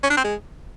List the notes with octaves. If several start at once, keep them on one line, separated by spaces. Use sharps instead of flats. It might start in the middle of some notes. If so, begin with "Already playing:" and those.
C#4
D4
C4
G#3